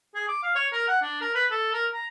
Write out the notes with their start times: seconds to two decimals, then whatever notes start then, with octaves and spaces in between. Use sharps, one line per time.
0.15 G#4
0.28 D6
0.43 F5
0.55 C#5
0.73 A#4
0.88 F#5
1.02 D4
1.21 A#4
1.35 B4
1.51 A4
1.73 A#4
1.93 A#5